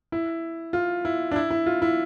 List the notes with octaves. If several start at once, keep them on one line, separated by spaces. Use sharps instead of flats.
E4
F4
E4
D4
E4
E4
F4
E4